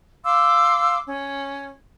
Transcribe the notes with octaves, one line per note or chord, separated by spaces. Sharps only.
F5 C6 D6 E6
C#4